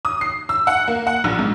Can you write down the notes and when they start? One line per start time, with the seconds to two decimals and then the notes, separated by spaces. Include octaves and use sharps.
0.05 D#6
0.21 C7
0.49 E6
0.67 F#5
0.88 A#3
1.07 F#5
1.24 A#1
1.39 G#2